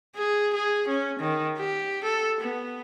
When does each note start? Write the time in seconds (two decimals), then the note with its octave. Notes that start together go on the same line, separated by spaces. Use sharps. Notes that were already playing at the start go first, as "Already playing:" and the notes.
0.16 G#4
0.54 G#4
0.88 C#4
1.20 D#3
1.58 G4
2.04 A4
2.41 B3